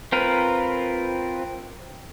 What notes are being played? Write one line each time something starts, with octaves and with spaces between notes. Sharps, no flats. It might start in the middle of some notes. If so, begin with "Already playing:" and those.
C4 F4 A#4 B4